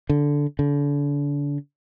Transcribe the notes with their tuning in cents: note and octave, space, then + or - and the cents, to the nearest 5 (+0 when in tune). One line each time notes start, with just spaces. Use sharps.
D3 -10
D3 -35